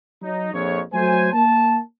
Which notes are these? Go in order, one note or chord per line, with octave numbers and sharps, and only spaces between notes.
F#3 D#4
A#1 F2 C#5
F#3 A3 C5 G#5
A#3 A5